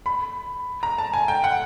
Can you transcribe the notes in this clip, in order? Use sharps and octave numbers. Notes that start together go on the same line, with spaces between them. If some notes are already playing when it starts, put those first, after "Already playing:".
B5
A#5
A5
G#5
G5
F#5